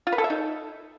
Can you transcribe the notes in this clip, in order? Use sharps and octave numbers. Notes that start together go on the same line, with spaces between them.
F4
B4
A4
E5
D#4